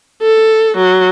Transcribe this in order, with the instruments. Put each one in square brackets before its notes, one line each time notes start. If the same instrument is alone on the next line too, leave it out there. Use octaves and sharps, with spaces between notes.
[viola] A4
F#3